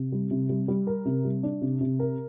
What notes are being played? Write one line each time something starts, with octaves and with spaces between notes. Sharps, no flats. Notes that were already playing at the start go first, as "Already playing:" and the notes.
Already playing: C3
G3
C3
G3
G3
A#4
C3
G3
D4
C3
C3
A#4